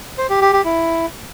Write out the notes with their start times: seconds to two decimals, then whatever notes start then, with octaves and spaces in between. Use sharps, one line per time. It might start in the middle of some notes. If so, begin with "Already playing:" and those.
0.18 C5
0.30 G4
0.41 G4
0.53 G4
0.65 E4